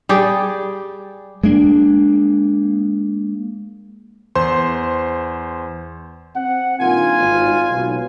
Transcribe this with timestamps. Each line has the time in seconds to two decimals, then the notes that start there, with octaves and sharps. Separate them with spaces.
0.09 G3 G4 G#4 D5
1.44 G#3 A#3 D4
4.35 E2 C5 C6
6.36 C4 F#5
6.81 G2 A#2 D#3 F4 G#5
7.19 G#1
7.71 B1